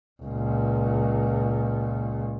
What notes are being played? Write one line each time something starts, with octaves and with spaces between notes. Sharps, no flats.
C#2 A#2